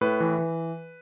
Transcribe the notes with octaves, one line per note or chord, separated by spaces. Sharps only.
A2 B4
E3
E3